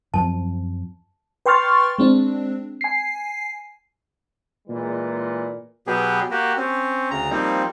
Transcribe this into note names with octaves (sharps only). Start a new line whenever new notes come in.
F#2 F3 C4 A5
B4 G5 C6 C#6 F6 A6
G#3 C4 D4
G#5 C7
A#2 E3 G#3
B2 F#3 B3 G4 G#4
A#3 F#4 G4
C4 C#4
D2 C#3 A#5
F3 G3 A#3 C4 D#4